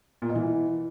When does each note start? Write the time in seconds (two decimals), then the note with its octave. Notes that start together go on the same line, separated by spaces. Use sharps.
0.22 A#2
0.29 B2
0.35 E3